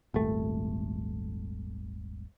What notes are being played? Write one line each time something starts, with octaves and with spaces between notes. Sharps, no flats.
D#1 G#1 A3